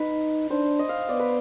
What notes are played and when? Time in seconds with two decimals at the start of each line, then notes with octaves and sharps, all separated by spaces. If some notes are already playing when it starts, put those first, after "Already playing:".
Already playing: D#4 B4
0.50 D4 C5
0.79 D#5
0.89 F5
1.09 B3 D5
1.19 B4